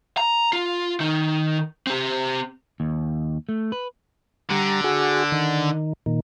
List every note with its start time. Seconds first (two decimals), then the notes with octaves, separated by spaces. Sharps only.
0.17 A#5
0.53 F4
1.00 D#3 D#4
1.87 C4 G4
2.80 D#2
3.49 A3
3.72 B4
4.51 D3 G3 A#5
4.84 F#4 G#4
5.32 D#3
6.06 A#2 D#3